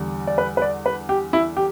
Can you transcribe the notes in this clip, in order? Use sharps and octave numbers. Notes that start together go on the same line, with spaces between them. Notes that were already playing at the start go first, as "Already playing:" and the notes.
Already playing: E2 D3 G3
D5
B4
B4
D5
B4
G4
E4
G4